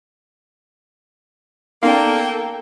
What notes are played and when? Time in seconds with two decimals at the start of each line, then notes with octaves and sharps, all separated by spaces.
1.83 A#3 B3 C#4 D#4 A4 D5 F5 G5